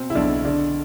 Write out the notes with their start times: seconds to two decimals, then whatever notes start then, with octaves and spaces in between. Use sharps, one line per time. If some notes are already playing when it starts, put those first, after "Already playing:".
Already playing: B2 C4
0.10 E4
0.15 B1 D4
0.45 D3 D4